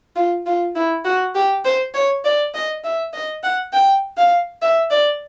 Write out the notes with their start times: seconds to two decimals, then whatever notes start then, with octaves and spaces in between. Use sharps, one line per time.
0.16 F4
0.46 F4
0.75 E4
1.05 F#4
1.35 G4
1.65 C5
1.94 C#5
2.24 D5
2.54 D#5
2.84 E5
3.13 D#5
3.43 F#5
3.73 G5
4.17 F5
4.62 E5
4.91 D5